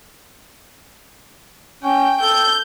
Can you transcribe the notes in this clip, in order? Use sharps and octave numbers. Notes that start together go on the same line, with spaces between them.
C#4 G5
A4 G6